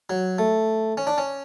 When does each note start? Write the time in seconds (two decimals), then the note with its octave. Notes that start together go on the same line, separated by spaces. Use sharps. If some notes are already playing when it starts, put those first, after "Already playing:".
0.10 F#3
0.38 A3
0.97 C#4
1.07 D4
1.18 C#4